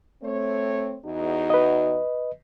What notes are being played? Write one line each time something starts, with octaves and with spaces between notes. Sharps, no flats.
A3 C4 C#5
E2 D#4 F#4
B4 D#5